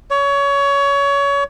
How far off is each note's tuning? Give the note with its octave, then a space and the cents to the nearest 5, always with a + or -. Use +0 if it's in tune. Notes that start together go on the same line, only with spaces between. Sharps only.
C#5 +25